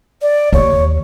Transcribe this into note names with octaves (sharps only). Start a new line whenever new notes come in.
D5
D#2 C#5